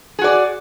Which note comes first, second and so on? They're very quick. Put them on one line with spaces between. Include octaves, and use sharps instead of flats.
G#4 F#4 D5